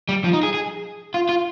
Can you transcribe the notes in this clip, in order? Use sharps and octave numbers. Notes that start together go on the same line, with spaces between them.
G3
F3
D#4
G#4
G#4
F4
F4